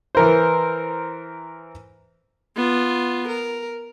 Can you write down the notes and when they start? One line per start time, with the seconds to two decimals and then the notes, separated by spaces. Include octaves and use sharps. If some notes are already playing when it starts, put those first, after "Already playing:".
0.15 E3 A#4 C5
2.56 B3 F4
3.28 A#4